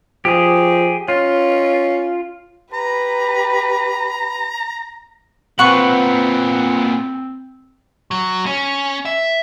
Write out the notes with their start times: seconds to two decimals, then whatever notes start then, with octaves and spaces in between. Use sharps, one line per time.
0.25 F3 G4 G#4
1.08 C#4 F4
2.73 G4 B4 A#5 B5
5.59 A#2 B3 C4 B4 C5 F#5 B5 C#6
8.11 F#3
8.46 C#4
9.05 E5